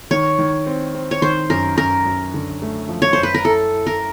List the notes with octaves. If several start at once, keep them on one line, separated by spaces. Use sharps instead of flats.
D#3 C#5
D#3
C4
C4
C#5
D#3 C5
F#2 A#4
F#2 A#4
F#2
D3
A3
F3
C#5
F#2 C5
B4
A#4
E4 A4
E4
A#4